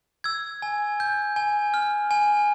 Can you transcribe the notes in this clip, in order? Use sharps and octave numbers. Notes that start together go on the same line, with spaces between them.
E6 G#6
G#5
G6
G#5
F6
G#5